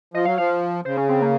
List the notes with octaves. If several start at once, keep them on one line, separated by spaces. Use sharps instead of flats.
F3 D#5
F#3 F5
F3 F5
C#3 C5
C#4
C4
A#3